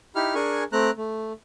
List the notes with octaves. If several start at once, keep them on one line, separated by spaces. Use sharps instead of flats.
D#4 E4 G4 F6
D4 G#4 A#4 G#5 C#6
A3 C4 A#5 F#6
A3